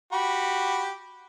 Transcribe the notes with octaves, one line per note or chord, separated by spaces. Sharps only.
F#4 G4 B5